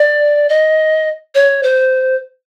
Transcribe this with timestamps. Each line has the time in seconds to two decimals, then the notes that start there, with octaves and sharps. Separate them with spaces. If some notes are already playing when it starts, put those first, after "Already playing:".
Already playing: D5
0.49 D#5
1.35 C#5
1.63 C5